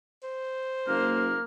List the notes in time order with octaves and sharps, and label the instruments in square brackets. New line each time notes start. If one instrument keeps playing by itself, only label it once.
[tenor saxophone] C5
[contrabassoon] F#1 [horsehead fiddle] A#3 [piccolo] F6